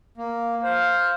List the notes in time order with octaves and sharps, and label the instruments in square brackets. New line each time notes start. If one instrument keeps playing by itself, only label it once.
[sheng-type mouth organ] A#3
[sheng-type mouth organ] C5 [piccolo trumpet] F5